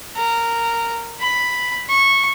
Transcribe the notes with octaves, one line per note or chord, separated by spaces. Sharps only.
A#4
B5
C#6